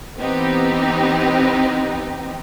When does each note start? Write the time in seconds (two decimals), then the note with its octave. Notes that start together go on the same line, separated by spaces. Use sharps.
0.17 E3 B3 C4 D#4 G4